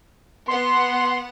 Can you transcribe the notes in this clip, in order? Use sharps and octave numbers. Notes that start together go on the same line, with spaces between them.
B3 F#5 C6